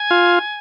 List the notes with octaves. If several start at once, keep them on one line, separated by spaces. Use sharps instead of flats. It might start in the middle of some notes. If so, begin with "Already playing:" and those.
Already playing: G#5
F4